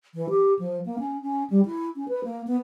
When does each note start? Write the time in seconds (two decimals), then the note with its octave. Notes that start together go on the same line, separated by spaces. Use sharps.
0.14 E3
0.30 G4
0.59 F3
0.86 A#3
0.99 C#4
1.22 C#4
1.50 G3
1.65 E4
1.96 C#4
2.08 B4
2.24 A#3
2.47 B3